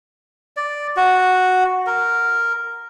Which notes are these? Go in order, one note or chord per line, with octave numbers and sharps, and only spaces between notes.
D5
F#4
A#4